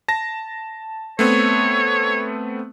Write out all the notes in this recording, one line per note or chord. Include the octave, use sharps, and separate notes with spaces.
A5 A#6
A3 B3 C4 C#5